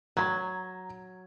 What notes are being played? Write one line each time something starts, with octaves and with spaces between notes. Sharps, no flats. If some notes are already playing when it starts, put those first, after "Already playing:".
F#3 A#5 G#6